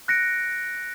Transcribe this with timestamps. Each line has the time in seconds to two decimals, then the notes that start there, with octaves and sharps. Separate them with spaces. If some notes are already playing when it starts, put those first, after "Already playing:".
0.08 F#6 A#6 C#7 D7